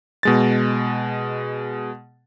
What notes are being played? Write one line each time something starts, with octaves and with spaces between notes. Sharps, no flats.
B2 G#3 A6